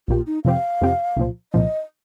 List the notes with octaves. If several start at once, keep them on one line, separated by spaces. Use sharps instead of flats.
A#1 A#2 A#3 F4 G4
D#4
F2 C3 F3 C4 G4 F5
F2 C3 F3 C4 G4
C2 A#2 F3
C2 A#2 F3 D#5